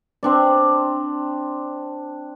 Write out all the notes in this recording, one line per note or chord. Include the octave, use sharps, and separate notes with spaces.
C4 D4 D5